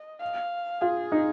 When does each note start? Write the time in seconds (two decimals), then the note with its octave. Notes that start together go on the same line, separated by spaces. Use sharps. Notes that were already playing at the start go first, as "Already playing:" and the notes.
Already playing: D#5
0.21 F5
0.81 F4 G#4
1.12 D#4